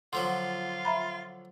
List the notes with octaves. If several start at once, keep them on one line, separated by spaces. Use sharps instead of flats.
D3 F3 F#3 F4 C6
E5 A#5 B5